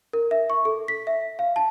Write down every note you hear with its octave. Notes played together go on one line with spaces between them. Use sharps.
A#4
E5
C#6
A4
B6
E5
F5
A5